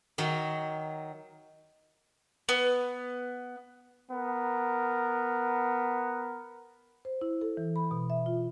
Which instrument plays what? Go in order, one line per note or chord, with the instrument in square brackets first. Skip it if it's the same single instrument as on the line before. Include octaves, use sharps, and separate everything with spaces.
[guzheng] D#3 F#3
[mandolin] B3
[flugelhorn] B3 [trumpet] A#4
[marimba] C5
E4
A4
E3
B5
B2
E5
F4